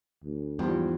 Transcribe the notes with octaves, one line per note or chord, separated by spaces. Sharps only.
D2
E2 G#2 F3 G3